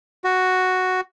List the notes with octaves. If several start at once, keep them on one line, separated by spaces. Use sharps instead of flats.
F#4